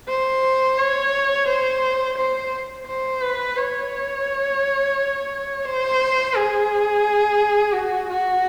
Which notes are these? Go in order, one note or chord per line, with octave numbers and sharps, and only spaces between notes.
C5
C#5
C5
C5
C5
B4
C#5
C5
G#4
F#4
F#4